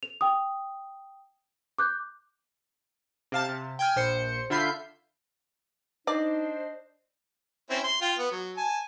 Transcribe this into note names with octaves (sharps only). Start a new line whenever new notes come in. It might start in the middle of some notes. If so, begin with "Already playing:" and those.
F7
G5 D#6
D6 F#6 G6
C3 F5 A5
C3
G5 G#5 F6
A#1 C5 C#7
D3 F4 E5 B5 G6 C7
D4 D#4 C5 D5 D#5
C4 C#4 E4
C6
F4 G5
B3
F#3
G#5 A5